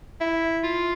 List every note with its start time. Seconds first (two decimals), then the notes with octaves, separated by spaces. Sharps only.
0.20 E4
0.64 F4